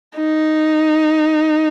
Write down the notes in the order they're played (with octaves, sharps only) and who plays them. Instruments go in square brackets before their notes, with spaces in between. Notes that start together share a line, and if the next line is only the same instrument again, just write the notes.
[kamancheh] D#4